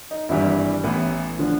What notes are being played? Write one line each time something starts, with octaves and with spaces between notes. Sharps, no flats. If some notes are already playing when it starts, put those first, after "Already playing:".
D#4
G#1 G2 E3 G3 E4
A1 A2 E3 B3
D3 F3